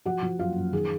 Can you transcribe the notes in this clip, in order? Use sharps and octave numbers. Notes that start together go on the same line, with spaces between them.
F3 F#4 F#5
F3
F#2 F4 F5
F#2
D#3 G#4